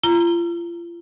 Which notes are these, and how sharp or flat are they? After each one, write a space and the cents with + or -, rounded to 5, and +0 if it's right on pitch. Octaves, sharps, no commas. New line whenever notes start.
F4 -35 A#5 +0